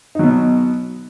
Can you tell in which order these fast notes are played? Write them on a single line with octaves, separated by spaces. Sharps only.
D#4 F#3 B2